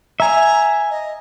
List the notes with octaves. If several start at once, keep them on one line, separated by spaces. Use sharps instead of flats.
E5 G#5 A#5
D#5